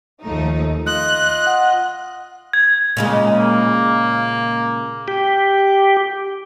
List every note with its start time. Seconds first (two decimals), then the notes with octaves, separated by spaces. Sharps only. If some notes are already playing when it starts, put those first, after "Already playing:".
0.23 D#2 F3 A3 D#4
0.86 F4 D#5 F#6
1.47 F#5
2.53 G#6
2.97 A#2 C#3 G#3
3.37 A#3
5.08 G4